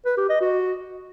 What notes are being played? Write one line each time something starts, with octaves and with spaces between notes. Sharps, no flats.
B4
G4
D#5
F#4